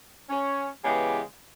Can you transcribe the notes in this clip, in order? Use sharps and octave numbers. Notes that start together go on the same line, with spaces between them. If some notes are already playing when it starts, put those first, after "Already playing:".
C#4
C#3 E3 G#3 B3 G4